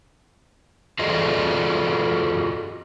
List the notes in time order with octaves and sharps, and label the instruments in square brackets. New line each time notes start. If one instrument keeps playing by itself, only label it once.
[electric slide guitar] F4 F#4 G#4 A4 D5 D#5